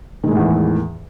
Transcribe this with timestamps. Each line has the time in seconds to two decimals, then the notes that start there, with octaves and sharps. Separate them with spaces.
0.24 D#3
0.27 G#3
0.31 A2
0.35 E2
0.39 E3